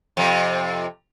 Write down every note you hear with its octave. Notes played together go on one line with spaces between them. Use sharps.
F2 C3